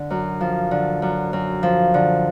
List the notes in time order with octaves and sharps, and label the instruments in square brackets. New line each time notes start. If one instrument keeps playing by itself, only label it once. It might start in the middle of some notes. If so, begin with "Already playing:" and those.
Already playing: [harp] D3
F#2
F3
D3
F#2
F#2
F3
D3